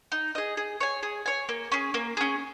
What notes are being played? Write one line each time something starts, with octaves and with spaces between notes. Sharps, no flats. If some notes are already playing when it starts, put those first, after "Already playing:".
D#4
G#4 D#5
G#4
C#5 G#5
G#4
C#5 G#5
A#3
C#4 G#4
A#3
C#4 G#4